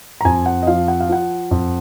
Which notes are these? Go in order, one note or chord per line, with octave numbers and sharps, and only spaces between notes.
A#5
F2 G#5
F#5
D#5
F3 F5
F#5
F5
F3 F#5
F2